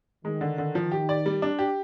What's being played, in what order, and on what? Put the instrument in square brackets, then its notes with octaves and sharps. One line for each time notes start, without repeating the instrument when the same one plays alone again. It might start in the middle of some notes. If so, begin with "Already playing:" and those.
[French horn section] D#3 [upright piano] G#3
[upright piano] D3
D3
F3
G4
D5
G3
D4
G4